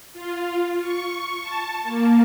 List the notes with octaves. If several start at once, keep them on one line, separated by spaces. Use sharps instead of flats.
F4
C#6
A5
A#3